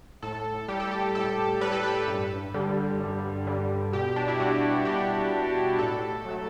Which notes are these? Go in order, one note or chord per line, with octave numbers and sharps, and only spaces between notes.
A2 A4
G3 G4
A4
G4
A2 A4
G3 B4
A4
B4
G2
D3 G3
G2
D3 G3
B2 G4
D4
E4
G3 F#4
B2 G4
G3
A2 A4
F#3 A3